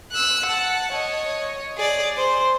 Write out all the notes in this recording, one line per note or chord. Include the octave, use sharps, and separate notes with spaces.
E6 F#6
F#5 A5
C#5 D#5
G#4 D5
C5